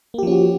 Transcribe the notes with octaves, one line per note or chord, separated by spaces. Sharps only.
F3 A#3 C#4 F#4 G4